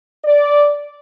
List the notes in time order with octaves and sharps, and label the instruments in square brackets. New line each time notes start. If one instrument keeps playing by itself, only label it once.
[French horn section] D5